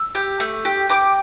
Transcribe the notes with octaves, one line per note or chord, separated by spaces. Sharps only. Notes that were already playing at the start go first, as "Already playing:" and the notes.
Already playing: E6
G4
A3
G4
G4 D6